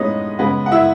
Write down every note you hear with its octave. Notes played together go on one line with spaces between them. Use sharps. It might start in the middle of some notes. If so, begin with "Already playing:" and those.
Already playing: A2 G#3 B3 D#4 C#5 D#5
C#3 G#3 B3
F#5
E4 E5